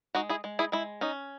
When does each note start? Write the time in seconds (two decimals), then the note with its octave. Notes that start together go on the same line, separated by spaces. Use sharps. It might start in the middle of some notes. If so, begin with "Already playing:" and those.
0.15 G#3 D#4 F#4
0.29 E4 G#4
0.44 G#3
0.59 E4 G#4
0.72 G#3 E4
1.01 C#4 D#4